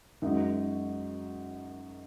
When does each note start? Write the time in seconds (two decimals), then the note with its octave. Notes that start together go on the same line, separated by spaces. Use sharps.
0.22 F#2 D#3 G#3 D#4 F#4